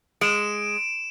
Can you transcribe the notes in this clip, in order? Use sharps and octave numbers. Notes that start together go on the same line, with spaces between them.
G#3 D7 E7